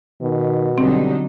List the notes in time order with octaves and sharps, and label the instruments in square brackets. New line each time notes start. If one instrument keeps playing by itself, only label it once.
[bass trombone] B2 [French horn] D#3
[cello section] D3 F#3 D#4 [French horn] G3 [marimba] C4